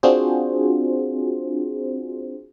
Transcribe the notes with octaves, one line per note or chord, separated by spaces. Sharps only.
C4 D4 F4 F#4 G#4 C5